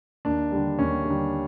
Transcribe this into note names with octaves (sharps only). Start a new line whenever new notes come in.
D#2 D4
D3 G3
D#2 C#4
D3 G3